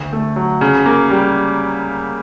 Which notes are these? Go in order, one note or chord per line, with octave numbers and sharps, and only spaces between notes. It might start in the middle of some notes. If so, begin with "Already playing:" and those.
Already playing: D2
A3
F#3
C#3
A#3
G3